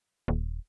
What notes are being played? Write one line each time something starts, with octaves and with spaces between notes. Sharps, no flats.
D#1